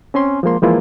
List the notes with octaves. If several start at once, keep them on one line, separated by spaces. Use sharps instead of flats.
C4 C#4 G#5 C6
F3 G#3 A#3 C6
E3 F3 G#3 A#3 E4 F4